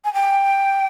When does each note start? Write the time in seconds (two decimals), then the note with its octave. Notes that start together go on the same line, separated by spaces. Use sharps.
0.05 G#5
0.14 G5